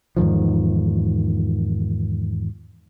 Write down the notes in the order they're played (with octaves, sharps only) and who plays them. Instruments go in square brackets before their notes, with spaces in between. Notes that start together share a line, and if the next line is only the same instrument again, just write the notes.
[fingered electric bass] E2 G#2 D#3 F3